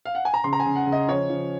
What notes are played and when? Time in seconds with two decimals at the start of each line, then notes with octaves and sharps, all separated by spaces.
0.05 F5
0.15 F#5
0.25 G#5
0.34 A#5
0.44 C#3 C6
0.53 A#5
0.60 G#5
0.66 C#3
0.75 F#5
0.87 C#3
0.92 D#5
1.08 F3 C#5
1.30 F3